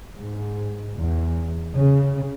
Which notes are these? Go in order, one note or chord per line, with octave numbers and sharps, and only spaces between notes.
G#2
E2
C#3